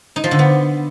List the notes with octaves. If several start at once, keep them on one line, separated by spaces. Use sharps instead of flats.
D#4
F3
D3
B3